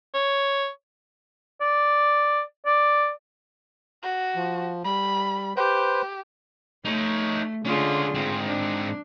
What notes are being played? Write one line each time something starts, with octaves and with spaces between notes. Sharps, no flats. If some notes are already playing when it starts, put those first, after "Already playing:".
C#5
D5
D5
F#4
F3
G3 B5
G4 B4 C5
A3 D#4 C#5
D3 G#3 C#4 F4 G#4
G#2 C4
D4